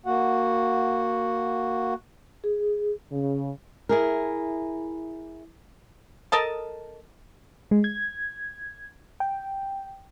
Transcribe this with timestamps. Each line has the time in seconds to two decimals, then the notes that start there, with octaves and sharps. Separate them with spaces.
0.06 A#3 F#4 F#5
2.44 G#4
3.12 C#3
3.89 E4 G#4 A#4
6.32 A4 A#4 D#5 A5
7.71 G#3
7.84 G#6
9.20 G5